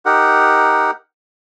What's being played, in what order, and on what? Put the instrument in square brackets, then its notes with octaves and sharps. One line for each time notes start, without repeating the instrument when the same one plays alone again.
[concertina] D#4 G4 A#4 F#5